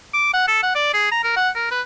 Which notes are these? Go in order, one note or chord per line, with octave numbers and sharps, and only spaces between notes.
D6
F#5
A4
F#5
D5
G#4
A#5
A#4
F#5
A#4
B4